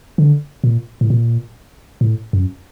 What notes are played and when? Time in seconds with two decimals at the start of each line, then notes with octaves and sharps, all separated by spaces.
0.18 D3
0.64 A#2
1.01 A2
1.10 A#2
2.01 A2
2.33 F#2